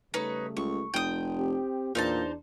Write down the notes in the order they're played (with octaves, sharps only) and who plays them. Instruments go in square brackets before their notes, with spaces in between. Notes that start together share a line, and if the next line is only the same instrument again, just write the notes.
[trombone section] C#3 G3 A3 [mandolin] D#4 B4 C#5
[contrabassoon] C#2 [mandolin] C#6
[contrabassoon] F1 [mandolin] G5 D#6
[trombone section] C4 G4
[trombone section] E2 D4 [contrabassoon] A#2 [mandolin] D#4 C5 A5